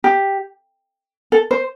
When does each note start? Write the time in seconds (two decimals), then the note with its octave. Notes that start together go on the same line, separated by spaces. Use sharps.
0.04 G4
1.32 A4
1.51 C5